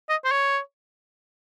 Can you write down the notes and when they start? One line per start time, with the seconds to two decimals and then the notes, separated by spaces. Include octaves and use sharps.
0.09 D#5
0.24 C5
0.31 C#5